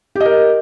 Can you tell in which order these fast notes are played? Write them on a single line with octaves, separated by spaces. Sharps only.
G4 D#5 A#4